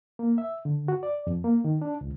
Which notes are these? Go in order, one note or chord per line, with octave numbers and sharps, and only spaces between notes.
A#3
E5
D3
F#4
D5
F2
A#3
D#3
D4
C#2